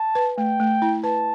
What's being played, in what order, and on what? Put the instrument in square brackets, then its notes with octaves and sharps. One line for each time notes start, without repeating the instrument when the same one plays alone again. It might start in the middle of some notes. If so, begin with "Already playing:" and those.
Already playing: [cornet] A5
[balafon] B4
[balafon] A3 [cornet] G5
[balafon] A3
E4
[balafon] B4 [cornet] A5